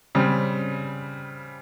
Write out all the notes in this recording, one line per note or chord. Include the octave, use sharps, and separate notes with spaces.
C#3 G3 C4